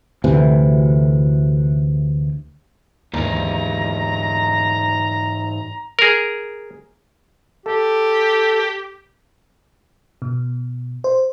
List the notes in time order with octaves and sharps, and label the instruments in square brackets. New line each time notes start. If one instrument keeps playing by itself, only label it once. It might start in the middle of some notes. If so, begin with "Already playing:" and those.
[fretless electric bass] D2 C3 E3
[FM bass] D#2 [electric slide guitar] G#2 E3 [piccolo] A#5
[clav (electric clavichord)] G#4 A#4
[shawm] G4 [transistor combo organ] A4
[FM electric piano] B2
C5